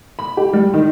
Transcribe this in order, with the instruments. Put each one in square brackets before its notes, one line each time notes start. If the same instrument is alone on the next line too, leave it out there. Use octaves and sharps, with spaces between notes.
[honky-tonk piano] B5
G4
G3
D#3